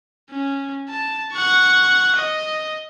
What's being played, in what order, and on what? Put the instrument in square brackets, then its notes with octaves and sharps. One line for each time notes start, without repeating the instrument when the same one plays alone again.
[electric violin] C#4
A5
F#5 C#6
D#5